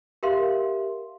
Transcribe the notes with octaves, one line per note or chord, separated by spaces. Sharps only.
G4 A#4 E5 F5 C6